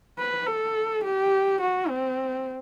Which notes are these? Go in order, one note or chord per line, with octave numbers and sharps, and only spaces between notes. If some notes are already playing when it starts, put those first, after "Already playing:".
B4
A4
G4
F#4
C4